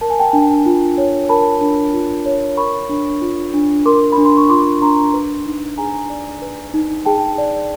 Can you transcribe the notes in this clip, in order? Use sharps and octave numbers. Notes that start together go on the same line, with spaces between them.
A#4 A5
G#5
G5 A5
D4
F4
C#5
A#4 A5 B5
D4
F4
C#5
A#4 B5 C#6
D4
F4
D4
A#4 C6 D6
B5
D4
C6
C#6
F4 C6 D6
D4 A#5 C6
B4
D#4
G#4 G#5 A#5
D5
B4
D#4
G#4 G5 A5
D5